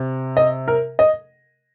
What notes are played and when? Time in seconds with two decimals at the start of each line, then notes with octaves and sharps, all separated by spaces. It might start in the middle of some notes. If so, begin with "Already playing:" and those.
Already playing: C3
0.37 D#5
0.68 A#4
0.99 D#5